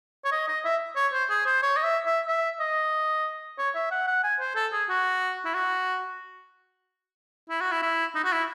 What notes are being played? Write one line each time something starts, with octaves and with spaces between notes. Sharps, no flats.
C#5
D#5
D#5
E5
C#5
C5
G#4
C5
C#5
D#5
E5
E5
E5
D#5
C#5
E5
F#5
F#5
G#5
C5
A4
G#4
F#4
E4
F#4
E4
F#4
E4
E4
D#4
F#4
E4